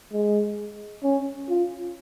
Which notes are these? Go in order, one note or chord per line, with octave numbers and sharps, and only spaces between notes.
G#3
C#4
F4